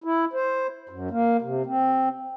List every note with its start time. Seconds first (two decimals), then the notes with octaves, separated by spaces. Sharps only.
0.04 E4
0.33 C5
0.89 F#2
1.11 A#3
1.42 C3
1.66 C4